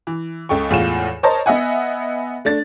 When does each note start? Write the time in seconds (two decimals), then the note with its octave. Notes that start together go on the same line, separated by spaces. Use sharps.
0.07 E3
0.49 C#2 A4 G5 C#6
0.71 E2 A2 G#3 F4 E7
1.23 A#4 C5 C#5 D#5 A5
1.46 B3 D#5 E5 F#5 G#5
2.45 A3 D4 A6